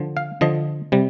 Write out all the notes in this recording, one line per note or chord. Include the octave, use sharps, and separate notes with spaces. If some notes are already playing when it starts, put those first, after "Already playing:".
Already playing: D3 F3
F5
D3 F3 D#5
C3 G3